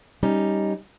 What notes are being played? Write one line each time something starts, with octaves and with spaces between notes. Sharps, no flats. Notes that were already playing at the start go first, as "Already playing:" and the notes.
G3 C#4 D#4